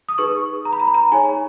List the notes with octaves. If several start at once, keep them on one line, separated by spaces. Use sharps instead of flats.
D#6
D#4 G#4 B4 C#6
A#5
B5
A#5
B5
A#5
D#4 G#4 C#5 G#5